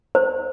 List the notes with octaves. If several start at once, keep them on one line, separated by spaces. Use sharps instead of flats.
C5